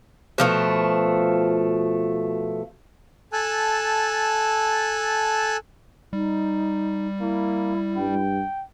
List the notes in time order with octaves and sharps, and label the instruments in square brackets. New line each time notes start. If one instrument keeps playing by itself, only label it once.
[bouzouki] B2 F3 A3
[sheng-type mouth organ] A4 G#5 A5 E6 F#6
[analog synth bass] G3 [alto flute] D#4
[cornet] A#3 [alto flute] E4
[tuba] G2 [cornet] G5